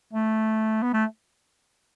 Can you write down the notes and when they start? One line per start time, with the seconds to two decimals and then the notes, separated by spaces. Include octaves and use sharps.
0.13 A3
0.83 B3
0.93 A3